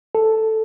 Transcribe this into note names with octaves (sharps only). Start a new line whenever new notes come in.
A4